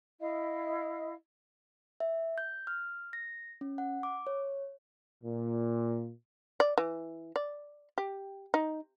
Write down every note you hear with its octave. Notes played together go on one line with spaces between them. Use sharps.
E4 D#5 F5
E5
G6
F6
A#6
C#4
F#5
D6
C#5
A#2
D5
E3
D5
G4
D#4